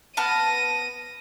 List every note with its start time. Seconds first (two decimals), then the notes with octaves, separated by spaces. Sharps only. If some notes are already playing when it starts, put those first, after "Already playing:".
0.17 B3 A5 F6 A#6 D#7